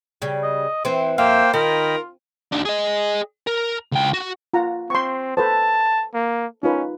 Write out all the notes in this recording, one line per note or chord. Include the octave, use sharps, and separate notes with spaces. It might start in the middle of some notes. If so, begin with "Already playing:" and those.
C#3 G3
D#5
E3 C4 C5
F2 A#3 C5 E5 F5 G5
D#3 F4 A#4 D#5 G5 B5
D#2 D4
G#4 D#5
A#4
C#2 G5
F#4
F4 F#5 A#5
C4 C6 C#6
A4 B4 C5 A5
A#3
C#4 D#4 F4 B4